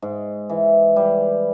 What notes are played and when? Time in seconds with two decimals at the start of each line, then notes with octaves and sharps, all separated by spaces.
0.02 G#2
0.49 E3
0.96 G3